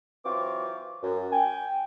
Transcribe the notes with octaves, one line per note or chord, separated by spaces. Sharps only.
E3 F#3 C4 F4 C#6 D6
F#2
G5 G#5